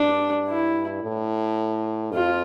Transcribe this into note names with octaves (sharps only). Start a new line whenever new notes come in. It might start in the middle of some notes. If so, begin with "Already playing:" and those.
Already playing: G2 D4
E4
A2
F2 F4